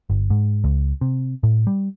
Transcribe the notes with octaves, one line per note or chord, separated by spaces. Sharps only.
G1
G#2
C#2
C3
A2
G3